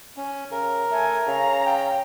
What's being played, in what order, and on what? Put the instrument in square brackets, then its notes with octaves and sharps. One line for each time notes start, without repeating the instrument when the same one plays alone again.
[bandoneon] C#4
[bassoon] C#3 [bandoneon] A#4
[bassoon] A3 [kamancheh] A4 G#5
[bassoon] C#3 [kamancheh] F5 A#5
[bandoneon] G5